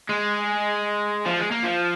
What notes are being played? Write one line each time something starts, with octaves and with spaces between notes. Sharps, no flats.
G#3
F3
G#3
A#3
F3